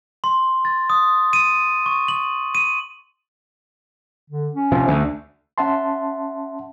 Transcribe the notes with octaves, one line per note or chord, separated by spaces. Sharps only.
C6
A6
D#6
D#7
C#6
F#7
D#7
D3
C#4
C3 F3
D2
C#4 E5 F#5 A5 C6